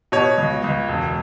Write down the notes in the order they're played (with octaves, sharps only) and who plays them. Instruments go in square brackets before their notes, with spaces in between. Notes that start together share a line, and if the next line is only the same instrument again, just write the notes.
[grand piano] B2 C#5
C#2
C#2
E1